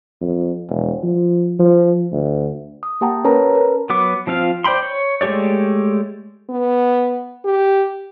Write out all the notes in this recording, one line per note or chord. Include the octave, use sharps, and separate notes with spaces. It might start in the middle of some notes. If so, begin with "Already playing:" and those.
F2
E1
F3
F3
D2
D#6
A#3 G4 F#5 G5 A5 A#5
C#4 A#4 B4 C#5 A5 A#5
A#4 B4
F#3 B3 D6
F3 C4 F4 F5
C5 D5 G5 B5 C6
C#5
G#3 A3 G4 C#5 D5
B3
G4